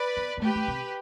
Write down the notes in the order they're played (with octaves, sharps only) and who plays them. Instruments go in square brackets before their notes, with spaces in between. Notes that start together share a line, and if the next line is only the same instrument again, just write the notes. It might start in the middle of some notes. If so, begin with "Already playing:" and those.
Already playing: [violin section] B4 D5
[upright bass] B3
B3
[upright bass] A3 [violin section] G4 B4
[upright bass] A3
C3